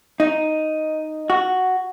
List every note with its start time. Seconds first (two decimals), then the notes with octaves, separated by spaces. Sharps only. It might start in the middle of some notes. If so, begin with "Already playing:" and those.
0.20 D#4
1.30 F#4